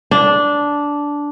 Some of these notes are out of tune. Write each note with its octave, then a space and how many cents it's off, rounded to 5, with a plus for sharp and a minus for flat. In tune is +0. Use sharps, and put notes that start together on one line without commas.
D4 -10